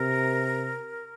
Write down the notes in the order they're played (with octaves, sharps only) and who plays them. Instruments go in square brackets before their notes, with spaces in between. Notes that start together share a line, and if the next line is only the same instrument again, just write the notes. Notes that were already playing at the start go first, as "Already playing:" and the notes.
Already playing: [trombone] C3 [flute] A#4